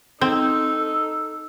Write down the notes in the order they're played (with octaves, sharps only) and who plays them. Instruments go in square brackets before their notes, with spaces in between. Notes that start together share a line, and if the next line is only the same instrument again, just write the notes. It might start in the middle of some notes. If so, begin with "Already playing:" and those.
[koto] C4 [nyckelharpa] D#4 [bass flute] A4